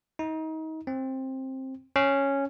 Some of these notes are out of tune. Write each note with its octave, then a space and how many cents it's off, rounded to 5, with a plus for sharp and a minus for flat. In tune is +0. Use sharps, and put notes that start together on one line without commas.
D#4 +30
C4 +15
C#4 -5